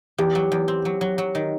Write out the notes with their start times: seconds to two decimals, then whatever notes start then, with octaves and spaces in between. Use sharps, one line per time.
0.18 E2 G4
0.35 F#3
0.52 E2
0.68 C4
0.85 F#3
1.01 F#3
1.18 F#3
1.35 D#3